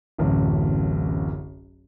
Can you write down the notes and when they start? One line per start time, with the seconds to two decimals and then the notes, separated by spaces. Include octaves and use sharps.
0.18 D1 A1 F#2